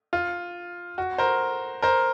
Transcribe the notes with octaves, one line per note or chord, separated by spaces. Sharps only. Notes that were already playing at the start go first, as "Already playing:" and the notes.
F4
F#4
A#4 C5
A#4 C5